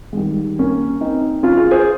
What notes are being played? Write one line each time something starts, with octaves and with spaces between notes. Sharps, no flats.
G#3
D#3 G3
A#3 C#4
C4 D#4
C#4 F4
F4 G#4
G#4 C5